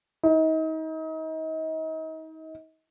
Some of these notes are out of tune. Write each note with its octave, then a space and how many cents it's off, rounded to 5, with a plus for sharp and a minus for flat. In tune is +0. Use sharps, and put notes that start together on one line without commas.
D#4 +35